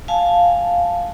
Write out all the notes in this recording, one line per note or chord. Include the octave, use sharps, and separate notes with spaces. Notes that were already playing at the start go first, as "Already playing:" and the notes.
F5 G#5 A5